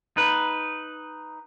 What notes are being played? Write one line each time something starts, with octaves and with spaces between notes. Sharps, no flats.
D#4 B4